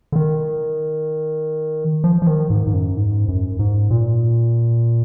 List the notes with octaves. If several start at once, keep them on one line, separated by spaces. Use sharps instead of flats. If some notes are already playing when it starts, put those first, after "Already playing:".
D3
D#3
F3
F3
D#3
G#2
G#2
F#2
G#2
F#2
G#2
A#2